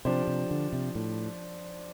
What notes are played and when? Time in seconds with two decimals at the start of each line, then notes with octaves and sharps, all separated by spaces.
0.05 C3 F3 D4 G4 C5
0.27 C3
0.51 D3
0.73 C3
0.95 A2